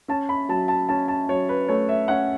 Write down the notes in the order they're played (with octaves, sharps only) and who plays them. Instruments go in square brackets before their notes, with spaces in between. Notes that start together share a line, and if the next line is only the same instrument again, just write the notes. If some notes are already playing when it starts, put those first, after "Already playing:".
[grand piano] C#4 A5
B5
F#3 A5
A5
C#4 A5
A5
F#3 C#5
B4
A3 C#5
E5
C#4 F#5